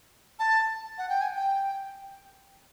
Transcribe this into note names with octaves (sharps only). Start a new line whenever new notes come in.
A5
F#5
G5
G#5
G5